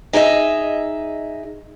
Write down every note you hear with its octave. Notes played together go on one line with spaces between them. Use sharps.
D#4 G#4 D#5 E5